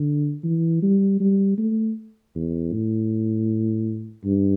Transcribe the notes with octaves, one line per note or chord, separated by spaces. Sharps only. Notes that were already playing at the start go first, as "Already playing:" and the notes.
Already playing: D3
E3
G3
G3
A3
E2
A2
G2